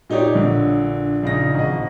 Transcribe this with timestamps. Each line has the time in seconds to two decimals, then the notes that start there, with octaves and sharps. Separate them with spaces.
0.10 A#2 D#4 G4 C#5 D5
0.35 A#1 D3
1.23 A#1 C#3 D#4 A#6
1.55 G#1 D#5